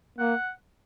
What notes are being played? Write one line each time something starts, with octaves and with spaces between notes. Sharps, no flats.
A#3 F#5